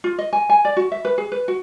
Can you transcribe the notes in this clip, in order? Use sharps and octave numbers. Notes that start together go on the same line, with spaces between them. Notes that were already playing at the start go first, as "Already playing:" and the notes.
F4
D#5
G#5
G#5
D5
F#4
E5
B4
G#4
B4
F#4